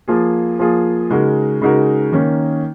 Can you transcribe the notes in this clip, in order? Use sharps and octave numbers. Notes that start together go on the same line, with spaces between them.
F3 A#3 F4 G#4
F3 A#3 F4 G#4
C#3 G#3 D#4 F#4 A#4
C#3 G#3 D#4 F#4 A#4
D#3 A#3 C#4